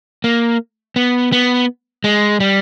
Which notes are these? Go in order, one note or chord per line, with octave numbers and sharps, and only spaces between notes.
A#3
B3
B3
G#3
G3